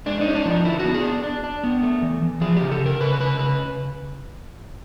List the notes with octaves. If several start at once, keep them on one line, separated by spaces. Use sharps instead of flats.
G#3 D4
C#4 D#4
D4
F3 D#4
D3 E4
F#4
B3
G#4
D4
D4
D4
B3
A3
E3
E3
F3 G#4
C#3 G4
A4
C#3
A#4
C#3 B4
C#3 B4
C#3 B4